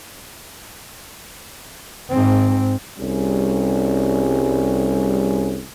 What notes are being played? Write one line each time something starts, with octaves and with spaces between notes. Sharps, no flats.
G#2 C4
C2 G3 C#4 G#4